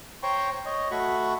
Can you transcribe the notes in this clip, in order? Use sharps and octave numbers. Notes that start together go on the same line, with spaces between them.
C5 C#5 G5 A#5 C6 C#6
C#5 D#5
A3 F#4 B5 C#6